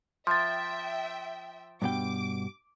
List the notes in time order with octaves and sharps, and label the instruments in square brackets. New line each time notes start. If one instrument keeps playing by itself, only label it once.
[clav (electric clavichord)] F3 [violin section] E5 G5 [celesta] C6 A6
[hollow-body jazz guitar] G2 B2 G5 [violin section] D6